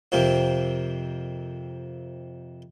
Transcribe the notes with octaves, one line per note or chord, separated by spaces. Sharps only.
F2 C3 A#3 C4